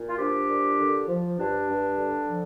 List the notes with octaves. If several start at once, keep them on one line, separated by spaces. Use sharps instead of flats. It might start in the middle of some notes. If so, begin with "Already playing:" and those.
Already playing: A#2
F4
F3 D4 G4
A#2
D3
F3
G2 D4
G2
D3
F3